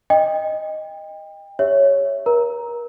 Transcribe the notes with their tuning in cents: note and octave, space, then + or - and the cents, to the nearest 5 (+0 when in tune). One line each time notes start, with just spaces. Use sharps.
D#5 +0 G5 +30
G4 +35 C#5 +0 E5 +0
A#4 +40 A#5 +5